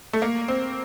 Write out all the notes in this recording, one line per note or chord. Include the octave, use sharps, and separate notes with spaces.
A3
A#3
C4